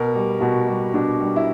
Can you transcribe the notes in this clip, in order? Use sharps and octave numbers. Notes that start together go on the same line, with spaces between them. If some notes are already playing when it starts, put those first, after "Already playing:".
Already playing: B2 A#4
G3
B2 F#4
G3
B2 D4
G3
E4